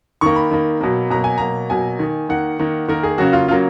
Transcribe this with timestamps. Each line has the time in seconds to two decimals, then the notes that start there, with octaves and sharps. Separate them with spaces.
0.21 D#3 A#3 C#6
0.36 B5
0.51 D#3 A#3
0.80 B2 F#3 A#3
1.10 B2 F#3 A#3 A#5
1.24 G#5
1.38 B2 F#3 A#3 A#5
1.70 B2 F#3 A#3 G#5
1.99 D#3 A#3
2.29 D#3 A#3 F#5
2.59 D#3 A#3
2.88 D#3 A#3 A#4
3.03 G#4
3.18 C#3 F#3 A#3 F#4
3.33 F4
3.48 C#3 F#3 A#3 F4